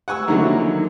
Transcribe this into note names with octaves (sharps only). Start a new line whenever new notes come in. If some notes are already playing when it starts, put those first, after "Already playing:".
F#5 G#5 C#6 E6
D3 D#3 F3 F#3 A#3 E4